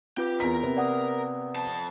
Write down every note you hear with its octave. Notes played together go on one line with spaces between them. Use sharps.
C4 F4 G4 B4 G5
E2 A#4 B6
C3 B3
D5 F#5 D#6
F2 A5